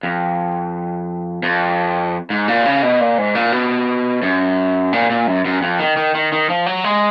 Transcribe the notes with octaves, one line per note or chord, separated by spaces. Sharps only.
F2
F2
G#2
A#2
C#3
B2
A#2
G#2
A#2
B2
F#2
A#2
A#2
F#2
F#2
F2
D#3
D#3
D#3
D#3
F3
F#3
G#3